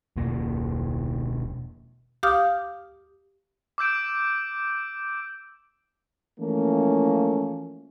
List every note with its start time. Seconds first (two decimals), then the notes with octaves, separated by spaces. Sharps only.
0.17 E1 B2 A#3
2.23 G4 F5 D6 D#6 F6 G6
3.78 D6 E6 G6 D7
6.39 E3 F3 A3 A#3 C#4